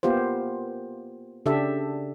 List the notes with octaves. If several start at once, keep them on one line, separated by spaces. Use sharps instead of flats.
A#3 B3 F4 G4 C5
C#3 D4 G4 A4 E5